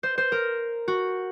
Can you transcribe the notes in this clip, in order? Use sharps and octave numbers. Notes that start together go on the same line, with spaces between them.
C5
C5
A#4
F#4